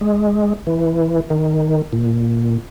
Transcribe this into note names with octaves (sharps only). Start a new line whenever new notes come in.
G#3
E3
D#3
A#2